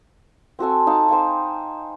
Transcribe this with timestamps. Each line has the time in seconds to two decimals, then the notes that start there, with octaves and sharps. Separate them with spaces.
0.59 C4 F#4 A4 G#5
0.87 D#4 F5 A5
1.08 C5 G5 G#5 C#6